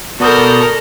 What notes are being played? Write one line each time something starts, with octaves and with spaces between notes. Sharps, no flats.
B2 B3 F#4 A4 A#4 D5 D#6 G6